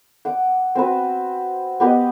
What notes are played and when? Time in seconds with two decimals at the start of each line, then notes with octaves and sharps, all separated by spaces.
0.25 F#5 D6
0.75 C4 F#4 B4
1.80 B3 G4 B4 D#5